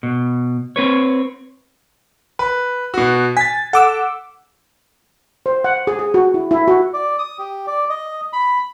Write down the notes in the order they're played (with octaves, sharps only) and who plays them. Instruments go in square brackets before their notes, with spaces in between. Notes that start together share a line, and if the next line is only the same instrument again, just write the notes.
[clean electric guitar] B2
C4 B4 C#5
[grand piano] B4
B2 F#4
[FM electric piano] G#5 A6 [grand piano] B6
[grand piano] A4 [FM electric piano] F#5 D6 E6
[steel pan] C5
F#5
G#4
G#4
F#4
E4
E4
F#4
[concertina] D5
D#6
G4
D5
D#5
B5